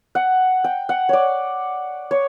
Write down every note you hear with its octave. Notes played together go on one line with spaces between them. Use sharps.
F#5
G5
F#5
C#5 D5
C#5